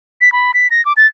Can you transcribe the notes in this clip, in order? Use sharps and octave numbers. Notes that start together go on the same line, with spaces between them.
B6
B5
B6
A#6
D6
A6